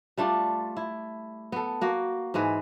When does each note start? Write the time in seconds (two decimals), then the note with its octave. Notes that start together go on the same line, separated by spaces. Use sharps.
0.17 G3 A3 D4 F4
0.77 E4
1.52 B3 A4
1.81 A#3 F#4
2.34 G#2 E3 G#3 B4